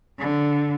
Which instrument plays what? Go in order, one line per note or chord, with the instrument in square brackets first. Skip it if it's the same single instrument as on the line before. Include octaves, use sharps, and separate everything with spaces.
[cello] D3